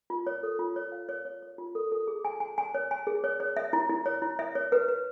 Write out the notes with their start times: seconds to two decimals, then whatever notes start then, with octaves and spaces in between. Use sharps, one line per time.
0.10 F4
0.27 C#5
0.43 A4
0.59 F4
0.76 C#5
0.92 F5
1.09 C#5
1.25 C#5
1.42 C#5
1.58 F4
1.75 A4
1.92 A4
2.07 G#4
2.25 G#5
2.40 G#5
2.58 G#5
2.75 C#5
2.91 G#5
3.07 G#4
3.24 C#5
3.40 C#5
3.57 E5
3.73 E4
3.89 E4
4.06 C#5
4.22 E4
4.39 E5
4.55 C#5
4.72 B4
4.88 B4